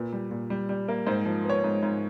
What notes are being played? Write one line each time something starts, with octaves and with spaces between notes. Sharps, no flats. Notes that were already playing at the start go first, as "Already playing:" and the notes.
Already playing: A#2 B4
G3
A#2
G3
G3
A#3
G#2 C5
F3
B3 C#5
G#2
G#2